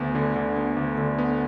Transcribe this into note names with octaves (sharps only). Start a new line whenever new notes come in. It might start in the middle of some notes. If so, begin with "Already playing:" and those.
Already playing: D2 B3
D3
D3
B3
D2
D3
B3